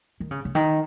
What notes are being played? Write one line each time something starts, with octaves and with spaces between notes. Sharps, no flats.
D#3
C#3
C#3
D#3